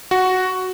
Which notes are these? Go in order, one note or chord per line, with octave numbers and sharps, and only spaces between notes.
F#4